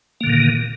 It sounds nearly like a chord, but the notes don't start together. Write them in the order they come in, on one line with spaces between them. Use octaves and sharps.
A#3 D3 A#2 D#3